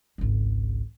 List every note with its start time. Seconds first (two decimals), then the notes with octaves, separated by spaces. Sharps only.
0.18 G#1 C#2